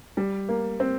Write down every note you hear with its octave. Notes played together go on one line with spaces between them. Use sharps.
G3
A#3
C4